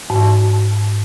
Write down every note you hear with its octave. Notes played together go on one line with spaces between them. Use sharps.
G#2